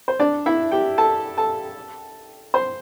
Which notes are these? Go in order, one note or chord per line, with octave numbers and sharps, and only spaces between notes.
C5
D4 D5
E4 E5
G4 G5
A4 A5
A4 A5
C5 C6